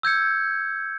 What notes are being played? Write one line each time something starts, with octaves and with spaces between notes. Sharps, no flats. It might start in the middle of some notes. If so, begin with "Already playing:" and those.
E6 G6 G#6 C#7